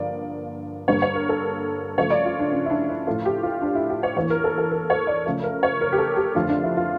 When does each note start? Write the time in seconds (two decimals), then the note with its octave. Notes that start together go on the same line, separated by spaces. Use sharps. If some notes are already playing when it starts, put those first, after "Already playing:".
Already playing: G2 D3 F3 A#3 D5
0.88 G2 D3 G3 A#3 C#5
1.02 C#5
1.15 A#4
1.29 A4
1.98 C#3 F3 A3 C#5
2.10 D5
2.25 F4
2.39 D4
2.52 C#4
2.66 E4
2.70 D4
2.89 E4
3.07 A2 F3 A3 F4
3.25 G4
3.43 F4
3.62 D4
3.75 E4
3.89 G4
4.03 C#5
4.16 E2 E3 A#3 C#5
4.30 A#4
4.44 A4
4.58 A4
4.71 A#4
4.90 C#5
5.07 D5
5.26 C#3 F3 A3
5.43 A#4
5.63 C#5
5.81 A#4
5.92 G4
5.98 A4
6.17 G4
6.35 F2 D3 A3 F4
6.49 D4
6.63 E4
6.77 F4